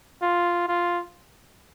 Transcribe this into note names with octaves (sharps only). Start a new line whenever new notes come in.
F4
F4